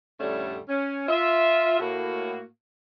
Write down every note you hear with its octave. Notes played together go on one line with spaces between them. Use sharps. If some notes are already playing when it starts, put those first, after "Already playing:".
F2 A2 D3 G3 A3 C#4
C#4
F4 E5
A2 A#3 F#4